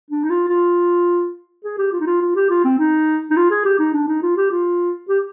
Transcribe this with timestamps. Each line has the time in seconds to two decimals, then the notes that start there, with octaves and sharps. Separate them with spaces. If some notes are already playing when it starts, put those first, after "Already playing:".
0.10 D4
0.24 D#4
0.30 F4
0.49 F4
1.64 G#4
1.78 G4
1.92 F4
2.00 D#4
2.07 F4
2.21 F4
2.35 G4
2.50 F4
2.65 C4
2.79 D#4
3.31 D#4
3.37 F4
3.51 G#4
3.65 G4
3.79 D#4
3.94 D4
4.08 D#4
4.22 F4
4.37 G4
4.51 F4
5.09 G4